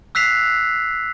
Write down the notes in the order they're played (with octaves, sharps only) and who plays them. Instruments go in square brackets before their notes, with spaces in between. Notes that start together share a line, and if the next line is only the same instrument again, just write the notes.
[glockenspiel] E6 F#6 B6 C7 F7